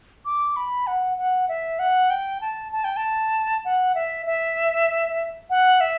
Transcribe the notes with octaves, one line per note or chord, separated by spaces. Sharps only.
D6
B5
F#5
F#5
E5
F#5
G5
A5
A5
G5
A5
F#5
E5
E5
F#5
E5